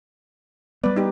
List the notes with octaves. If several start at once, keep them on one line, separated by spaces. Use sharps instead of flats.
G3 B3 B4 D5
D#4 G4